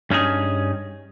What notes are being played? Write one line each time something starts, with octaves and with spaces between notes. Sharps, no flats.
G2 C#4 D#4 E4 G#4